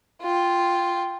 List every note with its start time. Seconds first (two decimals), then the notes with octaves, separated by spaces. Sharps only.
0.22 F4 G5